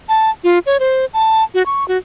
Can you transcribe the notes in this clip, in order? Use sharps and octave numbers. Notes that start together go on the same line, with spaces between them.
A5
F4
C#5
C5
A5
F#4
C#6
F#4